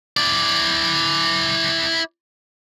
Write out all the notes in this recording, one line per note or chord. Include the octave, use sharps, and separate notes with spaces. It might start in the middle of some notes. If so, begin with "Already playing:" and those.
E4 D5